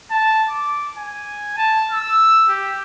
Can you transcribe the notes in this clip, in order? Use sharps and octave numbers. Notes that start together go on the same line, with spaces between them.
A5
D6
G#5
A5
E6
G4